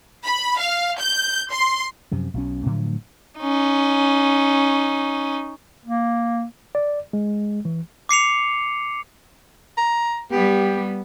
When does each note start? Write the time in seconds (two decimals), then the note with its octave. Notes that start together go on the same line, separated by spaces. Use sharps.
0.24 B5
0.59 F5
0.99 G6
1.52 C6
2.11 F#2 C3 F3
2.34 B1 B2 C#4
2.66 A2 D3 F3 F#3
3.40 C#4 D#4
5.86 A#3
6.75 D5
7.13 G#3
7.65 E3
8.09 D6 C7 C#7 F7
9.77 A#5
10.32 G3 B3 G4